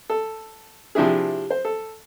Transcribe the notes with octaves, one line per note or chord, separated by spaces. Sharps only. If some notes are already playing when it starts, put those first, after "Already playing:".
A4
C3 F3 D4 E4 G#4
C5
A4